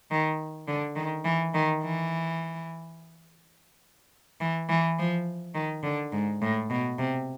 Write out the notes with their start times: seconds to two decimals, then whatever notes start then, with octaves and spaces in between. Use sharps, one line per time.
0.11 D#3
0.67 D3
0.96 D#3
1.25 E3
1.54 D#3
1.83 E3
4.40 E3
4.69 E3
4.98 F3
5.54 D#3
5.83 D3
6.12 G#2
6.41 A2
6.70 B2
6.99 C3